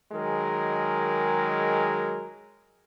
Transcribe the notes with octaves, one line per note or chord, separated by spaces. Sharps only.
D#3 F#3 G#3 G#4 A#4